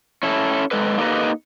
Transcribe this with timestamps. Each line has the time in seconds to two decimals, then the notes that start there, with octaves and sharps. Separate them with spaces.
0.23 C#4 E4 A4
0.71 G#2 G#3 A4 B4
0.98 A#3 D#4 G4 A4 B4 D#5